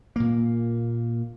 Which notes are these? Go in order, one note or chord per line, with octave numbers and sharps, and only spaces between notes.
A#2 A#3